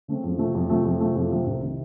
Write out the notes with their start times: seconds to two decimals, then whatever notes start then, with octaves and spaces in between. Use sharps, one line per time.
0.08 C#3 A3 C4
0.24 F2
0.38 C3 F3 A3
0.55 F2
0.70 C3 F3 A3
0.85 F2
1.00 C3 F3 A3
1.16 F2
1.31 C3 F3 A3
1.46 C2
1.62 C3 D#3